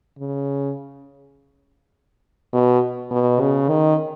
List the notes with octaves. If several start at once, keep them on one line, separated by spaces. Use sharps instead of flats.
C#3
B2
B2
C#3
D#3